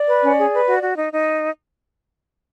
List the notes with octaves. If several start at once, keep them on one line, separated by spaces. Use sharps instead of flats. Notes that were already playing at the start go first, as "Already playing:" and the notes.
Already playing: D5
B4
C#4
G#4
B4
F#4
F#4
D#4
D#4